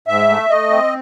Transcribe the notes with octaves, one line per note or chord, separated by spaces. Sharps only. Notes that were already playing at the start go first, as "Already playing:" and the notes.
G#2 E5
A3
A3 D#5
C4